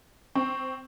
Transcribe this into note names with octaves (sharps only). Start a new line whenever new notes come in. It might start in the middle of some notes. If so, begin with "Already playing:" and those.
C4 C#6